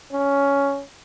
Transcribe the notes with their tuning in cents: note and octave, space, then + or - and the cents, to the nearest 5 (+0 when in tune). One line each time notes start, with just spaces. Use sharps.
C#4 +10